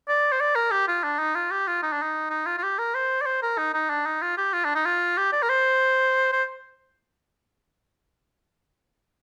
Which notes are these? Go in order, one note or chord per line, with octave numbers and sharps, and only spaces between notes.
D5
C5
D5
A#4
G4
F4
D4
D#4
F4
G4
F4
D#4
D4
D#4
D#4
F4
F4
G4
A#4
C5
D5
C5
A#4
D#4
D#4
D4
D#4
F4
G4
F4
D4
D#4
F4
G4
D5
A#4
C5
C5